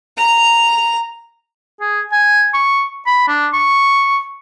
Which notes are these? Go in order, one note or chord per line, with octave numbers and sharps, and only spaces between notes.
A#5 F7
G#4
G#5
C#6
B5
D4
C#6